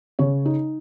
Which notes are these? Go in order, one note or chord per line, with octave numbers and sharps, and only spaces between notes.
C#3 C#5
D#4